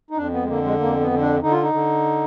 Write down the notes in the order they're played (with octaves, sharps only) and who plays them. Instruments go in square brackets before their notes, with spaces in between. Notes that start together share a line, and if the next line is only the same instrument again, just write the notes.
[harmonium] D#4
F2 D4
B3
G#3
D3 A#3
G#3
F2 A#3
B3
D3
D4
D3 D#4
F4
D#4
D3